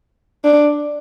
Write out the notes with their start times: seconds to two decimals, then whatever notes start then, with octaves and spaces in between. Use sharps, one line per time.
0.44 D4